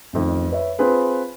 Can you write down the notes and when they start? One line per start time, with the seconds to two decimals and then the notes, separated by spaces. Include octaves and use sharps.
0.13 A1 F2 D#3
0.51 B4 C#5 E5
0.79 C4 F4 G#4 B4